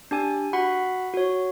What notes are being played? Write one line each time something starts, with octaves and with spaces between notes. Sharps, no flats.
D4 G4 G#5
F#4 F#5 B5
F#4 C#5